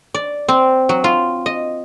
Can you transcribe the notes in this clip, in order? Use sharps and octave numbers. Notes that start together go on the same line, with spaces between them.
D5
C4
F#3
F4
D#5